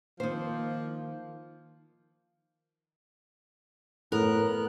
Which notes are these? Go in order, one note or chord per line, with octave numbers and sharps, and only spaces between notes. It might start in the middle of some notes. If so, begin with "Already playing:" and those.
D#3 F3 A#3 D#4 C5
A2 B3 A#4 F#6